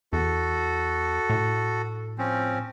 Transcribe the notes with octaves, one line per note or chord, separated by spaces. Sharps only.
E2 F#4 A4
A2
F3 C4 C#4